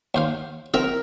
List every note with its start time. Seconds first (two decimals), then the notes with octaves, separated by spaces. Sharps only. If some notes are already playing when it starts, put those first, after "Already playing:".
0.15 D#2 C5 F5
0.74 C4 A#4 E5